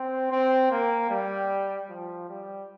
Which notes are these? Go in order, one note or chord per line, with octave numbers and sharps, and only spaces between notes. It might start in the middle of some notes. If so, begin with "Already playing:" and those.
Already playing: C4
C4
A#3
G3
F3
G3